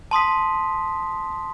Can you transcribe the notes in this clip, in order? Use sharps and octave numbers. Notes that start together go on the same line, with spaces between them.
A5 C6 D#6 B6